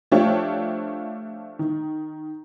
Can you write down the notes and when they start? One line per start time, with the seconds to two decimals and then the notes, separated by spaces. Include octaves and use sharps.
0.11 F3 A3 D4 F4 G4 C#5
1.59 D#3